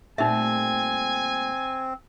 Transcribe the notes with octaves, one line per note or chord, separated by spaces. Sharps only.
A#2 G3 A3 C4 D#4 E5 G#5